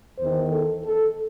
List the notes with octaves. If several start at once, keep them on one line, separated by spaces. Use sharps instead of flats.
E2 D#3 C5
A4
A4